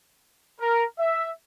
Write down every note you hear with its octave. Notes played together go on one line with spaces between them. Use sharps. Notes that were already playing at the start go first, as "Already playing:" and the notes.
A#4
E5